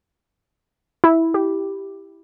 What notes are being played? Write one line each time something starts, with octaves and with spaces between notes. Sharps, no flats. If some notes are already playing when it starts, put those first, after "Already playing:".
E4
G4